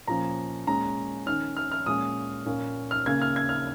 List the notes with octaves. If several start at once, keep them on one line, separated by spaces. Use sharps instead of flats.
A#2 F3 C#4 A#5
A#2 G#3 C#4 A#5
D#3 C#4 F6
F6
F6
A#2 G#3 C#4 D#6
A#2 A#3 C#4
F6
C#3 A#3 C#4 G#6
F6
G#6
F6